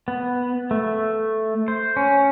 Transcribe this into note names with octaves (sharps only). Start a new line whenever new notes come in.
B3
A3
C5
C#4